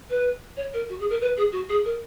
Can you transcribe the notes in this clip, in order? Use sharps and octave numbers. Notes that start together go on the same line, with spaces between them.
B4
C#5
A#4
F#4
G#4
A#4
B4
G#4
F#4
G#4
A#4